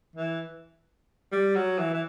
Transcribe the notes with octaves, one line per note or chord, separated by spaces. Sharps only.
E3
G3
F#3
E3
E3